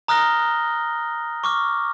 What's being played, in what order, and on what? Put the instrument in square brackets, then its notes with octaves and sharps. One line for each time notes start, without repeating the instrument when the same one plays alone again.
[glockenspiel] A#5 D#6 F6 F#6 A#6 G7
C#6 D6 F6